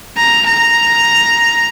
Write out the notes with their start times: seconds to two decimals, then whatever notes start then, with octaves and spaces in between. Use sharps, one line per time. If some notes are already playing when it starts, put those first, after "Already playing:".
0.18 A#5
0.46 A#5